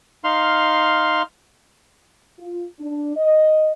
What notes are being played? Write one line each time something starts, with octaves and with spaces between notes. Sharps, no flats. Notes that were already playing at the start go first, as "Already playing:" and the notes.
D#4 F5 C6 F6
F4
D4
D#5